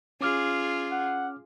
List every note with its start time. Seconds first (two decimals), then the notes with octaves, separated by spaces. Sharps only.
0.21 C#4 F4 G#4 D6 F6
0.92 F#5